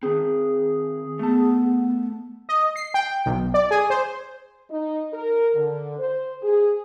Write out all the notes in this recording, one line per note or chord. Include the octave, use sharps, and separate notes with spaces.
D#3 C4 G#4
A3 B3 A5
D#5
C7
G5
B1
D5
G#4
C5
D#4
A#4
D3
C5
G#4